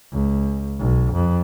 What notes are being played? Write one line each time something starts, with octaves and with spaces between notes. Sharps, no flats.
C#2
B1
F2